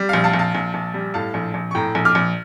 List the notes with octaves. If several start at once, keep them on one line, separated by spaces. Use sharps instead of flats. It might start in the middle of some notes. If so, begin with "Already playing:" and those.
Already playing: G3
A#1 F5
F5 A5
A#1
F5 A5
A#1
A#1
G3
A2 F5 A5
A#1
A#1
C#6
A2 G5 A#5
A#1
D6 F6
A#1